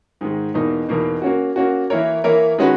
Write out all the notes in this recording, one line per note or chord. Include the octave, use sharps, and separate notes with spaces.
G#2 D#3 G#3
E2 B2 A#3 D#4
E2 B2 A#3 D#4
A#3 C#4 F#4
A#3 C#4 F#4
E3 A#3 E4 A#4 C#5
E3 A#3 E4 A#4 C#5
D#3 G#3 C#4 F#4 B4